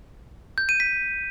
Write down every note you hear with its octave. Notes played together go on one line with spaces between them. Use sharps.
G6
D#7
B6